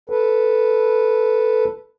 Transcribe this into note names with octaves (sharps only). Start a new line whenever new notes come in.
A4 B4